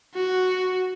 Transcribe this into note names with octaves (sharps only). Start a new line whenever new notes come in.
F#4